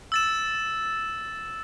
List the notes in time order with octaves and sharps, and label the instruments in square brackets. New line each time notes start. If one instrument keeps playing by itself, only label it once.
[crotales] E6 A6 E7